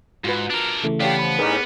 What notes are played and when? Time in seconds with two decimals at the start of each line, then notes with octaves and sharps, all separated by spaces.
0.24 G#2 F4 F#4 B4
0.50 D4 A#4
0.83 C#3 E3 A3
1.00 B3 G4 C#5 D5 F5 G5 A5
1.19 F3 B5
1.39 A2 C#4 D#4 G#4 A#4 B4 D5 D6